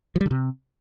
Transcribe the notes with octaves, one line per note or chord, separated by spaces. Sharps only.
F3
G3
D3
C3